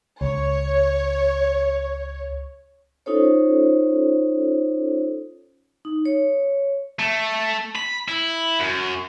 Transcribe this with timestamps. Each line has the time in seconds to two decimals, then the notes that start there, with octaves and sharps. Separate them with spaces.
0.21 C#2 C#5
3.06 C#4 D#4 F4 A4 C5 C#5
5.85 D#4
6.05 C#5
6.99 A3
7.75 B5
8.08 E4
8.60 F#2